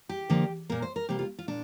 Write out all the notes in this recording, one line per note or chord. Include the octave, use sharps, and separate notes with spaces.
G4
D3 F3 A#3
A#2 A#3 A#4
C5
A#4
C3 G3 A#3 G4
F4
F4
A#2 D4